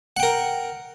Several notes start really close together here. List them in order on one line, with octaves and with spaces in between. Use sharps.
F#5 G5 A#4